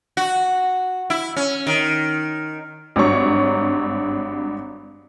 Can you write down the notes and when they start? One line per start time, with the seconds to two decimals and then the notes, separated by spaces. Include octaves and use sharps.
0.17 F#4
1.10 E4
1.36 C#4
1.67 D#3
2.96 G#1 G2 F#3 C#5 C#6